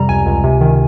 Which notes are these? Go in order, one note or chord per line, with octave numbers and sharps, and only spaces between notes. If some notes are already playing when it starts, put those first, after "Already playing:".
Already playing: F2 C3 G3 A#5
C#2 G#5
C#2
C3
D#3